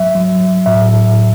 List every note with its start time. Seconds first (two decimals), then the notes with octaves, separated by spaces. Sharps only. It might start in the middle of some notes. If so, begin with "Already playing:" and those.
Already playing: F#3 E5
0.15 F#3
0.41 F#3
0.66 A2 E5
0.92 A2
1.18 A2